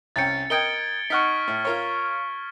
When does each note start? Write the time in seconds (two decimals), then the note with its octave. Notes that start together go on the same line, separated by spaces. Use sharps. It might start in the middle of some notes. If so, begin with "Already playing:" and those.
0.16 C2 C#4 G5 A6 C#7
0.50 A#4 D#5 G5 G#6 D7 G7
1.10 D#4 F#5 C#6 F6 B6
1.48 A2
1.65 F4 A#4 C#5